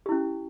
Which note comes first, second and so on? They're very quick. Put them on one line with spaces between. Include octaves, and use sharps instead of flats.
G4 E4 C#4